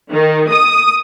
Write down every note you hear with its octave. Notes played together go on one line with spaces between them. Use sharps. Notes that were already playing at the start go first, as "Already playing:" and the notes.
D#3
D#6